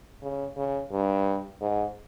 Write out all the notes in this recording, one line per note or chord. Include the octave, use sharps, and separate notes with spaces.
C#3
C#3
G2
G#2